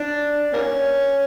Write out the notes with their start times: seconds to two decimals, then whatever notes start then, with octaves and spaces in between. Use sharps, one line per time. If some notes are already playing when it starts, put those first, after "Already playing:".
Already playing: D4
0.53 A#3 C#4